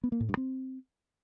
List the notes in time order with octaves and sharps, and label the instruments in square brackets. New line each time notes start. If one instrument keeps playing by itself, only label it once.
[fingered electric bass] B3
A#3
A2
G2
C4